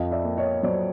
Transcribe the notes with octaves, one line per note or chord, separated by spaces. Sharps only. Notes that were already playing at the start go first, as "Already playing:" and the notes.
Already playing: F2 D#5 F5
D5 E5
A#3
C#5 D#5
F#3 C5 D5